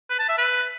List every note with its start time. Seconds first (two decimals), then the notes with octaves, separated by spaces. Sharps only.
0.10 B4
0.19 A5
0.29 E5
0.38 B4